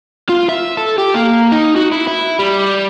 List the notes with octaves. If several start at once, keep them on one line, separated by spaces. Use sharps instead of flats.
F4
E5
A4
G4
A#3
D#4
F#4
E4
E4
G3